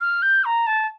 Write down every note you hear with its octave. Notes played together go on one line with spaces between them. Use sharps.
F6
G6
A#5
A5